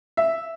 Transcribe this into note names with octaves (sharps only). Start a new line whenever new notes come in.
E5